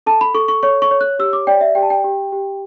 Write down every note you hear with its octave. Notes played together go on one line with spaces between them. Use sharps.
A4 A5
B5
A4 C#6
C#6
C#5 C#6
C#6
C#5
F#6
G4 E6
D6
D5 G5
E5
G4 G5
A5
G5
G4
G4